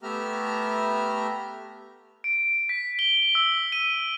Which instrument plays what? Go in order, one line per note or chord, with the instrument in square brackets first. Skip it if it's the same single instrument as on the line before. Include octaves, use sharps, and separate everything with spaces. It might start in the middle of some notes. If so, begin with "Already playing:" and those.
[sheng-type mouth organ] A3 B3 G4 E5 A#5 F6
[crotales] D7
B6
G7
E6
D#7